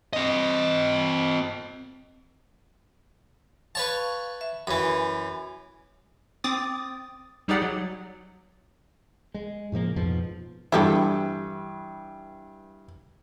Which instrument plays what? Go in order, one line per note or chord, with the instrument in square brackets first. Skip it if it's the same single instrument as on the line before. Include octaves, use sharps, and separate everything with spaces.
[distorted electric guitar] C4 D#5
[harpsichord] B4 C#5 A5 [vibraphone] F5 C#6
[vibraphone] E5
[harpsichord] F#2 E3 [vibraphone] G#5 B5
[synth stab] C4 D6 D#6 A6
G3 D#4 G4 G#4 D5 F#5
F#3
[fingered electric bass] G#3
A2 C#3 F3 A#3
F2 G#2 B2 F3
[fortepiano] G2 E3 [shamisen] E4 G4 A4